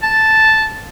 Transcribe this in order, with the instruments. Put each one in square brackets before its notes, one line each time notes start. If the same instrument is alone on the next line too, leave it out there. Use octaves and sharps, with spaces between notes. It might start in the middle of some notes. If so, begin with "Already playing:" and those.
[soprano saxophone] A5